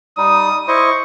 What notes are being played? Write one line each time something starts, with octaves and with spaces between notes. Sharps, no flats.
G3 D#4 D#6
E4 C5 D#5 C#6